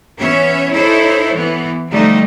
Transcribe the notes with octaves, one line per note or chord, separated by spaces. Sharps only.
E3 B3 C#4 C#5 E5
D#4 E4 A4 C5 C#5
E3 B3
D3 F3 G3 A3 D#4